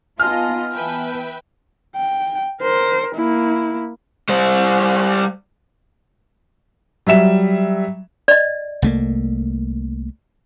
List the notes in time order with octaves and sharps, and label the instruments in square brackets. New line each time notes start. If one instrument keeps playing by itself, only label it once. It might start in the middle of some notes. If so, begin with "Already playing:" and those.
[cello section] B3 D#4 F4 [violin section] D#5 [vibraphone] G#5 A5 [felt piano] F6
[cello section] E3 B3 [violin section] B4 E5 G5
[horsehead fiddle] G5
A#4 C5
A#3 E4
[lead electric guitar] G3 C5
[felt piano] F#3 G3 E5 E7
[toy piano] D5 D#5
[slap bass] C2 A3 A#3